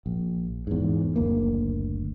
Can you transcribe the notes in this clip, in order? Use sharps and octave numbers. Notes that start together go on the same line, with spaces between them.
A#1
E2 G#2
F#1 D2 A#3